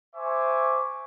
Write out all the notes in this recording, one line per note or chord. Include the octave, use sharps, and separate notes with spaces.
C5 E5 G#5 C#6 D6